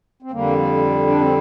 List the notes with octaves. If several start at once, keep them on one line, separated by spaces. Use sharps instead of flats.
C4
F2 D3 G3 A#3
D4
C4